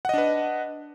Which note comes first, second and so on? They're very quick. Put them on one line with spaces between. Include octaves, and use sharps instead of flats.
F#5 D#5 D4 B4